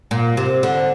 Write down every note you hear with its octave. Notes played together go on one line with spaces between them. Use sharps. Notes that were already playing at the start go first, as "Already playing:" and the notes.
A#2
C3
D3